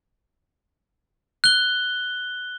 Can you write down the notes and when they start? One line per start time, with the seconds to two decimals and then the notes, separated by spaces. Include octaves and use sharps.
1.44 F#6 G7